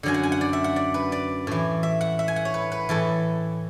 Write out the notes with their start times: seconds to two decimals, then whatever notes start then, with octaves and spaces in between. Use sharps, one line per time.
0.03 F#2 D3 F#3 G#5
0.14 F#5
0.23 G#5
0.32 F#5
0.41 D5
0.53 E5
0.64 F#5
0.76 D5
0.94 B4
1.12 D5
1.47 A2 E3
1.83 E5
2.01 F#5
2.19 E5
2.28 G#5
2.36 F#5
2.45 C#5
2.54 B4
2.72 B4
2.89 A2 E3 A4